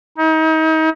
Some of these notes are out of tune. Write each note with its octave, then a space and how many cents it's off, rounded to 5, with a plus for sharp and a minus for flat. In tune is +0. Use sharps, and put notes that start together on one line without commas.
D#4 +35